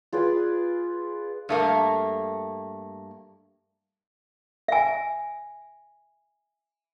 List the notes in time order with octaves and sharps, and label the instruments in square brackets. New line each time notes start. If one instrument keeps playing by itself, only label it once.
[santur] F4 G#4 B4 D5
[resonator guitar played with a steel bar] G2 A3 A#3
[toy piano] E5 G#5